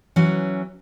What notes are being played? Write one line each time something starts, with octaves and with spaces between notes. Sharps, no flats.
E3 F#3 C#4